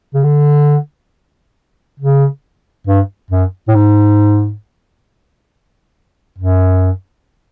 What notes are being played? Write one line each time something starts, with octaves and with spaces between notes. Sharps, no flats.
C#3
D3
C#3
G2
F#2
A2
G#2
F#2